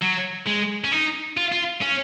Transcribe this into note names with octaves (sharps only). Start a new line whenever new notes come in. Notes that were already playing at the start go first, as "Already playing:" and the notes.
F#3
G#3
C#4
D#4
F4
F4
C#4